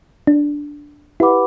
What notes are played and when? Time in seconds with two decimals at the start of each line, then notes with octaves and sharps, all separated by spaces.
0.27 D4
1.20 E4 G4 B4 F#5 B5 D6